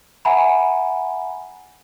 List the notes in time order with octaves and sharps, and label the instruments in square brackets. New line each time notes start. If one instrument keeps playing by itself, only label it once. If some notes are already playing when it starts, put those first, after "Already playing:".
[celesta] E5 F#5 G#5 A#5 B5